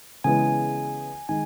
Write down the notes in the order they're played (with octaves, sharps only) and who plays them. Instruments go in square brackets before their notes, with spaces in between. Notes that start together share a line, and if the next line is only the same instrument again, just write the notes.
[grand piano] C#3 E3 G#3 B3 [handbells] G#5
[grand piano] D#3 G#3 [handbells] G#5